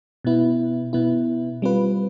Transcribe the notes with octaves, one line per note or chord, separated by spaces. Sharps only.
B2 B3 E4
B2 B3 E4
G3 C4 F4 B4